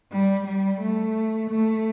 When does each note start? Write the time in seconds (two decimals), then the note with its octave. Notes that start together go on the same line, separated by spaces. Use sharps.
0.12 G3
0.47 G3
0.81 A3
1.50 A3